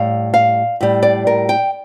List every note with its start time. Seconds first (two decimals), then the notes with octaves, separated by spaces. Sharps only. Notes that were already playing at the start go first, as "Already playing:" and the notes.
Already playing: A2 G3 F5
0.34 F5
0.81 A2 G3
1.03 D5
1.27 A#4
1.49 G5